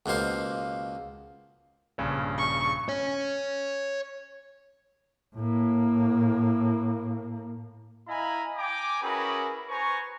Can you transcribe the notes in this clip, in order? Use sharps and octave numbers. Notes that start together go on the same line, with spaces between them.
C#2 B2 A#3 C5 F5
A#1 G2 C#3
C#6
C#5 G#5
A2 A#3
E4 D#5 F5 G#5 A#5 B5
G5 G#5 A#5 D6
C#4 E4 F#4 G#4 A#4 B4
B4 C5 G#5 A#5 C#6